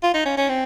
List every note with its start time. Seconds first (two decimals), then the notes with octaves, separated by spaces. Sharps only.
0.03 F4
0.14 D#4
0.25 C#4
0.37 C#4
0.49 C4